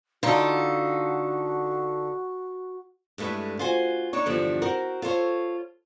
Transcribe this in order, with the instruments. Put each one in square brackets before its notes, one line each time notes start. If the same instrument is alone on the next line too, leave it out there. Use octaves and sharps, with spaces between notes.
[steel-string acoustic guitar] D3 D#4 [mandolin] F4 A4 [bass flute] F#4
[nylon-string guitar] G2 G#3 A3 E4 B4
F4 F#4 C5 G#5
D4 D#4 C#5
E2 G2 D3 F3
C4 F#4 A#4
F4 A4 C5 C#5